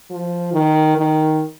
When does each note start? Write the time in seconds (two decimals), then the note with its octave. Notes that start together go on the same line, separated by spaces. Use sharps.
0.10 F3
0.53 D#3
0.97 D#3